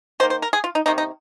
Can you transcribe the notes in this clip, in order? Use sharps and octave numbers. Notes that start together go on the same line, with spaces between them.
D#3 A#3 C5
C5
A#4
G#4
F4
D#4
C3 D#3 A#3 D#4
D#4